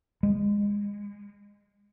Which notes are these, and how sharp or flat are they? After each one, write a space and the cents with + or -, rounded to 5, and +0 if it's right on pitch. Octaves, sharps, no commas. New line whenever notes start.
G#3 -25